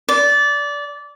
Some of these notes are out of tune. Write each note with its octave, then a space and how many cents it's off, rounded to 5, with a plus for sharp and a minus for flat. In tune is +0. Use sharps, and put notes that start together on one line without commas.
D5 -20